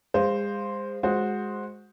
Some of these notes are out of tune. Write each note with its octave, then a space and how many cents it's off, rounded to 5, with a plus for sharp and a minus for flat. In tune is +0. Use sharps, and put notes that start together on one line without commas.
G#3 -35 C5 +0 F5 +0
G#3 +0 F#4 -15 C5 +0